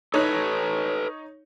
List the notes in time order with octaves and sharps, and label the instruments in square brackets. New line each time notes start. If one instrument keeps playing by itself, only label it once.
[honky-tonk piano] D#4 C#5 [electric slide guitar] A4 B4